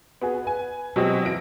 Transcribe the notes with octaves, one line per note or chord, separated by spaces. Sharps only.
B3 F#4 G#4
B4 G#5
B2 F#3 G#3 C4 G4
F#1 E3 A#6 D7